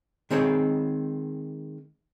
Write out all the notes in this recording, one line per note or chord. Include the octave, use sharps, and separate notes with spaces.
D#3 G#3 C4 G#4 C#5